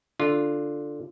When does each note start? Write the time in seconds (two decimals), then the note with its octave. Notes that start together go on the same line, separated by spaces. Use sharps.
0.19 D3 F4